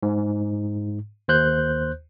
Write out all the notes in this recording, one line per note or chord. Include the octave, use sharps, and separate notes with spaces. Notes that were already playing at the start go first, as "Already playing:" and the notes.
G#2
D#2 C5 F#6 G6